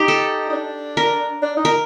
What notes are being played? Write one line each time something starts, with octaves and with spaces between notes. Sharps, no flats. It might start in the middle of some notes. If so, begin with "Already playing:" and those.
Already playing: D#4 G4
A4
D#4
D4
A#4
D4
D#4
A#4